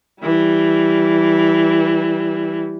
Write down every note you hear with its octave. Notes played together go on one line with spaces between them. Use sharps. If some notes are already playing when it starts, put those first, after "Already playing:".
E3 G3